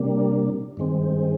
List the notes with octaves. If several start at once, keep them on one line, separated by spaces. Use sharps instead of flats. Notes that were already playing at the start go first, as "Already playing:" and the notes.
Already playing: C3 G3 A#3 D4
G2 D#3 G#3 C4